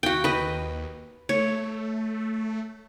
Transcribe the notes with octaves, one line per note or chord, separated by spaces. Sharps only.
D#2 F#4 G5
B4 D#5
A3 C#5